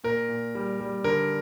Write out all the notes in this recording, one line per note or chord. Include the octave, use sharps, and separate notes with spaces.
A#2 A#4
A#2
G3
G3
D3 A#4